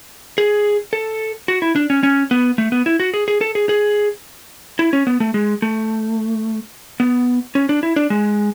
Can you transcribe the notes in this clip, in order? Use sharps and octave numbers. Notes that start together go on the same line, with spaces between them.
G#4
A4
F#4
E4
D4
C#4
C#4
B3
A3
B3
E4
F#4
G#4
G#4
A4
G#4
G#4
E4
C#4
B3
A3
G#3
A3
B3
C#4
D4
E4
D4
G#3